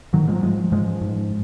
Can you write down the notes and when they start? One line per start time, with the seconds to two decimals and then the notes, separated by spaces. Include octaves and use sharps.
0.13 G#2 D#3 F#3
0.28 F3 G#3
0.35 F#3
0.42 G#2 F3 G#3
0.72 G#2 F3 G#3
1.01 G#2